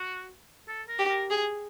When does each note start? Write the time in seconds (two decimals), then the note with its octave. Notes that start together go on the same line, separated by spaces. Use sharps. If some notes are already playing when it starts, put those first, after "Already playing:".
Already playing: F#4
0.68 A4
0.88 A#4
0.99 G4
1.09 A#4
1.30 G#4